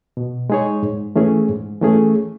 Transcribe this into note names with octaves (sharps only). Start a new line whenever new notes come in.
B2
G#3 D#4 G#4 C#5
G#2
E3 A3 C#4 G#4
G#2
E3 A3 C#4 G#4